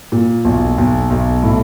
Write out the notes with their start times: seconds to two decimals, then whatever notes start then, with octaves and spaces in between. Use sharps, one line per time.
0.12 A#2
0.45 B1
0.78 B1
1.10 B1
1.43 A2